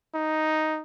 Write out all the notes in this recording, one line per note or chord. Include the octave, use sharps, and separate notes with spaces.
D#4